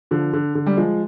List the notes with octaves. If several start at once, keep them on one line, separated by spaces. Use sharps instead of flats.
D3 F3
D3
D3
G3
F3 G#3